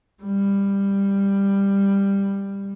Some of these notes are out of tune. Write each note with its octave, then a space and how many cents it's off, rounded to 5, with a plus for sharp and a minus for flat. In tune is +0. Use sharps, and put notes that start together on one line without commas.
G3 +15